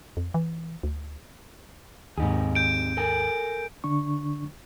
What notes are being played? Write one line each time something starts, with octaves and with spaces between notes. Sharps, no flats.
F2
E3
D2
D#2 G#2 C3 D#4 G#4
G6 D7
A4 A#4 G#5
D3 D4 C#6